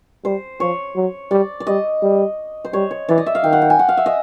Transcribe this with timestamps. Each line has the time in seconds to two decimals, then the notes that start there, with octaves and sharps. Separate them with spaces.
0.25 G3 C5
0.60 F3 C#5
0.96 F#3
1.31 G3 D5
1.60 D5
1.67 G3 D#5
2.03 G3
2.65 C5
2.73 G3 C#5
2.91 C#5
3.09 E3 D5
3.18 D#5
3.26 E5
3.35 F5
3.44 D#3 G5
3.53 F#5
3.62 G5
3.70 G#5
3.79 F#5
3.89 F5
3.97 E5
4.06 D#5